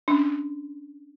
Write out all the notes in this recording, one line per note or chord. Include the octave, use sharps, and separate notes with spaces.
C#4 D4